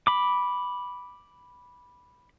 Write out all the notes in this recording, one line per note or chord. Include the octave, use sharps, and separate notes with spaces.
B5 D6